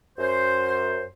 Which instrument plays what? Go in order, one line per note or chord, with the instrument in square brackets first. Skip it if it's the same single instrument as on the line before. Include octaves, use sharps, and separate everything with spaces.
[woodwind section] F#2 C5